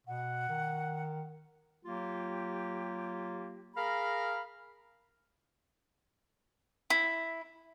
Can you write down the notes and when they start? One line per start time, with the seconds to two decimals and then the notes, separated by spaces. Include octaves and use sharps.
0.07 B2 F#5
0.49 D#3
1.84 F#3 A#3 F4 G4
3.76 G#4 A#4 F5 A#5 B5
6.90 E4